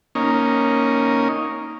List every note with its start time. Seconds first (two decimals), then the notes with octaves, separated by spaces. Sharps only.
0.15 A#3 C#4 D#4